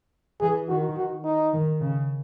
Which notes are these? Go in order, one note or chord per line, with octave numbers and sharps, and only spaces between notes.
E3 G#4
D#3 F#4
F#4
D#4
D#3
C#3